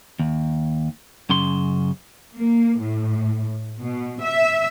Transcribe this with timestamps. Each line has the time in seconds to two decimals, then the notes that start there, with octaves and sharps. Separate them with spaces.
0.19 D#2
1.30 F#2 C#3 C6
2.35 A#3
2.79 A2
3.81 B2
4.23 E5